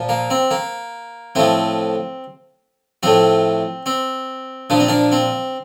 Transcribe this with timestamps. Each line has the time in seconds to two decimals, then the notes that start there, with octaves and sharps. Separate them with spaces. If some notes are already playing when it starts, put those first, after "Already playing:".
Already playing: A#2 F3
0.09 A#3
0.30 C4
0.51 A#3
1.35 A2 F3 C4
3.03 A2 F3 C4
3.86 C4
4.70 A#2 F3 D4
4.79 C4
4.88 A#3 D4
5.12 C4